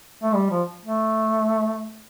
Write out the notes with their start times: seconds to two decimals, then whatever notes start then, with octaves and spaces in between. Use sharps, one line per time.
0.23 A3
0.34 G3
0.50 F3
0.85 A3